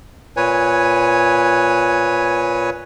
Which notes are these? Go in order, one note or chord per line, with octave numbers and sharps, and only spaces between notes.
A#2 B4 C#5 G#5